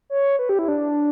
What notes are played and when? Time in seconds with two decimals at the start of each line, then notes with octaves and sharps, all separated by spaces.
0.10 C#5
0.39 B4
0.49 G4
0.59 E4
0.68 D4